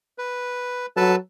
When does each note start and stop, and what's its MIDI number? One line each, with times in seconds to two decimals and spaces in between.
0.18 0.86 71
0.97 1.16 54
0.97 1.16 69
0.97 1.16 71
0.97 1.16 81